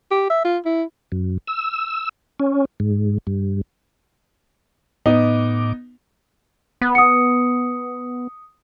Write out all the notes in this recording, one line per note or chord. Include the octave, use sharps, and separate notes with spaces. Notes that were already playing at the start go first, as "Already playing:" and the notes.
G4
E5
F4
E4
F#2
E6
C#4
G#2
G2
A2 B3 D#4 D6
B3
D#6 C#7